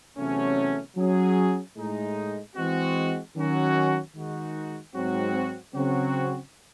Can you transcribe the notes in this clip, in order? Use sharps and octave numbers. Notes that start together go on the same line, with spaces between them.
E2 C3 F#3 A3 C#4
F#3 C#4 G#4
A2 G#3 D#4
E3 G#3 C4 F#4
D#3 F#3 C#4 F#4
D#3 G#3 D#4 F#4
G#2 F#3 C4 F#4
C#3 F#3 C4 F#4